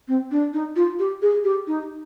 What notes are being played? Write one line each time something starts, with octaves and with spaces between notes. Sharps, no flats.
C4
D4
D#4
F4
G4
G#4
G4
D#4